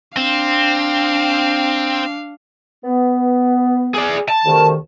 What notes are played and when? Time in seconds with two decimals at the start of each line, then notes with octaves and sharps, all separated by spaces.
0.17 C4 D4 F5
2.85 B3
3.94 G#4 D5
4.29 A5
4.45 D2 C3 D#3